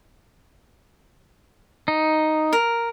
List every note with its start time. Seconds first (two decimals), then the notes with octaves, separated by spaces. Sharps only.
1.88 D#4
2.53 A#4